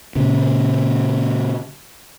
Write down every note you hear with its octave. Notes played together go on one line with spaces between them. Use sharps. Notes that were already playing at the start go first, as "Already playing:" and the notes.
A#2 C#3